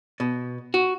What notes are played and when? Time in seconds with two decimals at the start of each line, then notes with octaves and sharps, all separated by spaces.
0.20 B2
0.74 F#4